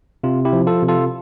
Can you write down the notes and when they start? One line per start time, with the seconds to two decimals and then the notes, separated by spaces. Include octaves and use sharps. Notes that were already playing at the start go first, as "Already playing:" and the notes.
0.24 C3 F4
0.45 E4 G4
0.53 F3
0.67 F4 A4
0.82 C3
0.89 F4 A4